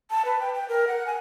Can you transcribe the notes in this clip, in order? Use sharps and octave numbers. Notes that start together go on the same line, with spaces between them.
A5
B4
G5
G5
A#4
F#5
G#5